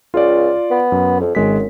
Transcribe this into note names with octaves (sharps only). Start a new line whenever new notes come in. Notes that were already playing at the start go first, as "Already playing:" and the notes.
C#2 F4 D5
B3
F#2
F2
G#1 F#2 G#3 B6